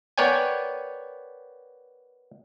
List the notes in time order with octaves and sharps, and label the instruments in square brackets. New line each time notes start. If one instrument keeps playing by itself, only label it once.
[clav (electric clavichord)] B3 A#4 C#5 D5 G5 G#5